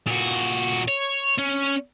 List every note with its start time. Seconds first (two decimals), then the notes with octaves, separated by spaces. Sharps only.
0.07 A#2 F#4
0.88 C#5
1.39 C#4